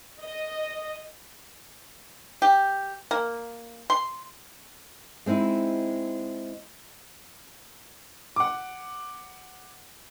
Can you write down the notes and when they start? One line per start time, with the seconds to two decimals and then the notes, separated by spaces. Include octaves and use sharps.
0.22 D#5
2.42 G4
3.11 A#3
3.90 C6
5.26 G#3 C4 D#4 E4
8.36 F#5 D6